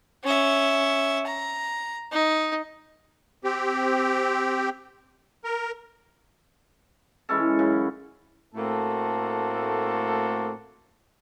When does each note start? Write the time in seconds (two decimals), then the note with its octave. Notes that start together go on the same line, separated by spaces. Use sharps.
0.24 C#4 E5
1.27 A#5
2.12 D#4
3.44 C4 G4
5.44 A#4
7.29 E3 G#3 C#4 A4
7.59 F#2 C#3
8.55 A2 A3 A#3 C4 F#4 A4